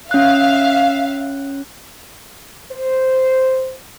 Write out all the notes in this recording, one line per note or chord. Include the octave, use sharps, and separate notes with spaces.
C#4 E5 F5 F#6
C5